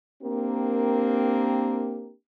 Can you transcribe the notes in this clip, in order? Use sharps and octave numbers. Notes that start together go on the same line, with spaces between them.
A#3 C4 D4 G4 A#4